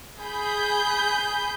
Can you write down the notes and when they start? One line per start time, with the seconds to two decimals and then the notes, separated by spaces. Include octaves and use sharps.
0.22 G#4 B5 G6